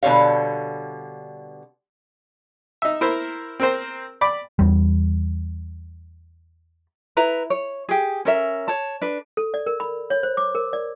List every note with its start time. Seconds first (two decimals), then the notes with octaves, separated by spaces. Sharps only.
0.03 B2 D3 G3 C#5 F5
2.82 D#4 E5
3.01 E4 A#4 C5
3.60 C4 A#4 C5
4.21 D5 B5 D6
4.59 E2 G3
7.17 E4 B4 A#5
7.50 C#5
7.89 G4 G#4
8.25 C#4 A#4 E5
8.68 C#5 A5
9.01 D4 B4
9.37 A4
9.54 D5
9.66 A#4
9.80 B5
10.10 C#5
10.23 C5
10.37 D6
10.55 A#4
10.73 D5